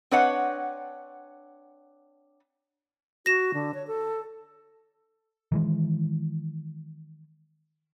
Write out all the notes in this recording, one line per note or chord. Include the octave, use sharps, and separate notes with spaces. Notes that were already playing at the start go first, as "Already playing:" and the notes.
C4 D4 B4 C#5 D#5 F#5
F#4 A#6 E7
D3
C#5
A4
D#3 E3 G#3